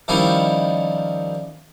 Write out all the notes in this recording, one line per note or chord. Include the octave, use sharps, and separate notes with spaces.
D#3 F3 G3 C#4 D#4 E4